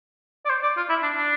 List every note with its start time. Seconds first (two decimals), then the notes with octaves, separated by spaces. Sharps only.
0.45 D5
0.50 C5
0.63 D5
0.77 F4
0.89 E4
1.03 D4
1.17 D4